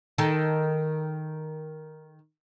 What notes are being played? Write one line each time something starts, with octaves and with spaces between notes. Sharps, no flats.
D#3 A4